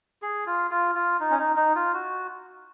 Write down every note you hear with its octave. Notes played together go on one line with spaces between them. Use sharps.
G#4
F4
F4
F4
D#4
C#4
D#4
D#4
F4
F#4